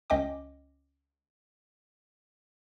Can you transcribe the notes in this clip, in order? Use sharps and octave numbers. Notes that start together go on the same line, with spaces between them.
C#2 C#4 D#5 G5 D6